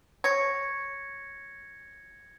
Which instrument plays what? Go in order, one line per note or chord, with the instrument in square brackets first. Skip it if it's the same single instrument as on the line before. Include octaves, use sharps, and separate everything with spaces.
[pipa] C#5 [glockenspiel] G#6 A#6 C#7